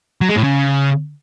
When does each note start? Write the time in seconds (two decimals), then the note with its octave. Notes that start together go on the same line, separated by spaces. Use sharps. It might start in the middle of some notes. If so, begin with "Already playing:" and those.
0.21 F#3
0.29 G#3
0.36 A2
0.44 C#3